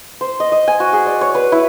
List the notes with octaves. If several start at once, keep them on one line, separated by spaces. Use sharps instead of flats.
C5
D#5
D#5
G#5
F#4
G#4
D5
C#5
B4
E4